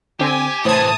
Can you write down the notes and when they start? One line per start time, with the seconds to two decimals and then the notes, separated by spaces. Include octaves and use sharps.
0.20 D3 C4 G4 G#5
0.65 A2 C3 E3 C5 A5 D#6 G#6